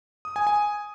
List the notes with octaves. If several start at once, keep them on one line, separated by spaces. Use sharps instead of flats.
D#6
G#5
G#5